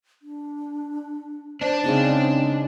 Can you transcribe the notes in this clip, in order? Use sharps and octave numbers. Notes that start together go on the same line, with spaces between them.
D4
D4 C5 D5
C#3 G#3 C4 D#4